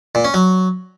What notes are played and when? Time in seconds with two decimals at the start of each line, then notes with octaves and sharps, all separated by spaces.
0.15 A#2
0.24 C#4
0.34 F#3